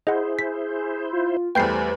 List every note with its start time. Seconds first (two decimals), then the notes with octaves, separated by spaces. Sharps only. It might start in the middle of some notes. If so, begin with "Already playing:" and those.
0.07 E4 G#4 C5 D#5 F#5
0.39 B6
1.13 F4
1.55 E2 G3 A3 B4 C5 G5 G6 C7